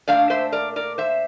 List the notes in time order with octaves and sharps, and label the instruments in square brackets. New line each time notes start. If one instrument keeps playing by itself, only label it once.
[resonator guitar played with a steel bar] A#2 A3 D4 D5 F5
C5 E5
A#4 D5
A#4 D5
C5 E5